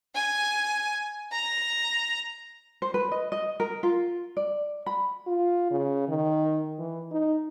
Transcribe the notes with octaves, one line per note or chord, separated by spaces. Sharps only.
G#5
A#5
C5
B4
D#5
D#5
A#4
F4
D5
B5
F4
C#3
D#3
E3
D#4